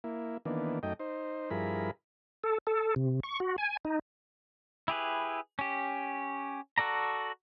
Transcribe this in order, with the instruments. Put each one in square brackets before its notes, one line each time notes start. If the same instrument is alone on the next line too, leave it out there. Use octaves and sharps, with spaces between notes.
[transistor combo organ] A#3 E4
D#3 E3 A#3 B3 D4
F#2 A3 D#4 D#5 G5
D#4 C5
G2 F3 E4 G#4 A#4 B5
[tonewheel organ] A4
A4
C3
C#6
F#4
G#5
D#4
[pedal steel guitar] E4 G4 G#4 B4
C#4 G4
F#4 A4 D5 A#5